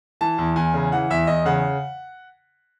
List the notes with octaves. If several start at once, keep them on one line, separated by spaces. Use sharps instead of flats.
E3 A5
E2
E2 G#5
C#3
E3 F#5
E2 E5
E2 D#5
C#3 F#5